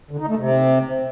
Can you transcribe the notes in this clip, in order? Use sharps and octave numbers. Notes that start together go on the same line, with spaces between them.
D3
D#4
A3
C3